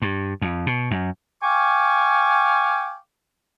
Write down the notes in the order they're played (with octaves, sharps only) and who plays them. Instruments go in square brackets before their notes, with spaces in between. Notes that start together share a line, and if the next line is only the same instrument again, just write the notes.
[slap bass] G2
F2
B2
F#2
[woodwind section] F5 G5 G#5 C#6 D6